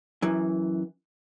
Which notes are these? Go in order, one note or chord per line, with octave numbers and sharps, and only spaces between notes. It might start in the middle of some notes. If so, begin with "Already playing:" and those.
F#2 E3